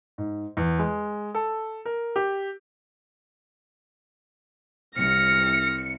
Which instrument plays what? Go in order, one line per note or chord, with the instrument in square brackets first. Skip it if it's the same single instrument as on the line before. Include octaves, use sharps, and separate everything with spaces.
[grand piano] G#2
E2
G#3
A4
A#4
G4
[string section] C2 C#7 [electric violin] F6 A#6